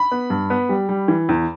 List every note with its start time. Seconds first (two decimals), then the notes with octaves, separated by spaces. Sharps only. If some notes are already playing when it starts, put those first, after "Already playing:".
Already playing: B5
0.11 B3
0.30 G2
0.50 B3
0.69 G3
0.89 G3
1.08 E3
1.29 E2